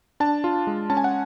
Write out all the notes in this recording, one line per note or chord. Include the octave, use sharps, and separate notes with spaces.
D4 A5
F4
G#3
C#4 A5
G#5
F#5